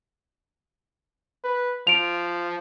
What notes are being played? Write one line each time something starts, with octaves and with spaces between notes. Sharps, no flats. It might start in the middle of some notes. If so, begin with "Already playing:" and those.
B4
F3 D7 F7